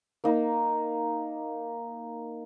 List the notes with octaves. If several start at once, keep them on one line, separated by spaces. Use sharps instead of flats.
A#3 D#4